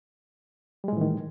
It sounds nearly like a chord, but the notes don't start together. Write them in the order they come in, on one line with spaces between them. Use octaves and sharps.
G3 G#3 A2 E3 D#3